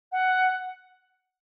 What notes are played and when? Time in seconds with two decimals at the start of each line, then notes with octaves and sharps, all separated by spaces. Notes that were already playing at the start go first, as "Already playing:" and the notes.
0.12 F#5